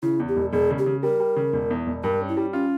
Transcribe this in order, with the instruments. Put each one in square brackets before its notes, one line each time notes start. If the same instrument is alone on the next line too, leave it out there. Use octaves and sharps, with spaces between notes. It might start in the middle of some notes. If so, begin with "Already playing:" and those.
[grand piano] C#3 [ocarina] E4
[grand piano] E2
[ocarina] G4
[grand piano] E1
[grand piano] E1 [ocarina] G#4
[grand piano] C#3
[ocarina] G4
[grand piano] C#3
[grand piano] G3 [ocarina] A#4
[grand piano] G3
C#3
E1
E2
E1
[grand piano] G2 [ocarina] A#4
[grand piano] C#4
[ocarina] E4
[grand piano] G3
[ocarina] C#4 [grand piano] F4